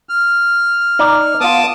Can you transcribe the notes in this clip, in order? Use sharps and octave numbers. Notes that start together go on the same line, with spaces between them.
F6
D#4 D5
B3 F4 A5 D6 D#6